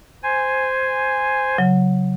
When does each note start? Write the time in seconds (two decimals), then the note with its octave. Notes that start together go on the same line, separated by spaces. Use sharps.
0.23 C5 G#5
1.58 C#3 F#3